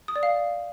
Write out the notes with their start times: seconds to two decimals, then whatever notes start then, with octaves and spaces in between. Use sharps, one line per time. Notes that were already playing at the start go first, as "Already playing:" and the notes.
0.08 D#6
0.16 D5
0.23 F5